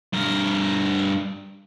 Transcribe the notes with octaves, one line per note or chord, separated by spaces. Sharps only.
G2 A#4